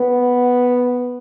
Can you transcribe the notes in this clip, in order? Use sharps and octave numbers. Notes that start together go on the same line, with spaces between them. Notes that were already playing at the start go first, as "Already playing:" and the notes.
Already playing: B3